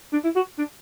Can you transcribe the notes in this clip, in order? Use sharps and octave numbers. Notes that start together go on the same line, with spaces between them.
D4
E4
F#4
D4